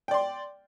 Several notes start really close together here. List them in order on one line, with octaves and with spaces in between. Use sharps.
G5 D5 C6